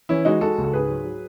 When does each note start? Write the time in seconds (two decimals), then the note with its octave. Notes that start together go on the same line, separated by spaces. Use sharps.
0.09 E3 C#4 E4
0.25 G#3 D#4 F#4
0.41 G#3 F#4 A4
0.58 C#2
0.64 A4
0.73 G#2 G#4 B4
0.89 F#3
1.04 F#3